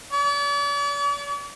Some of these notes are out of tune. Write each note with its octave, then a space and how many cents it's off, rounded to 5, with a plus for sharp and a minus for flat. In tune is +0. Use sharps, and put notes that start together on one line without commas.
D5 -45